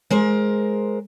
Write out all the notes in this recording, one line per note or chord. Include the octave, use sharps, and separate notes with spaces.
G#3 A#4 C5